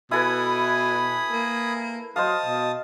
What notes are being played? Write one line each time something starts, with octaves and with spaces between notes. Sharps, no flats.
B2 E4 A4 B4 G#5 B5 D#6
A#3
F#3 C5 D#5 F5 A5 D#6
B2